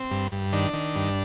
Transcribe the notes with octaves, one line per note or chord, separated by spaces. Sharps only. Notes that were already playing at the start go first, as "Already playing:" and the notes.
Already playing: C4
G2
G2
D#3 D4
D#3
G2